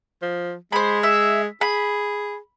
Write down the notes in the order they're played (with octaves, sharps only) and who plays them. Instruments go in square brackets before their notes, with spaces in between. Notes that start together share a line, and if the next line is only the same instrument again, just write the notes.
[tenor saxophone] F3
[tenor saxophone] G#3 [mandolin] C5 B5
[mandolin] E5
[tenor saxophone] G#4 [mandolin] B5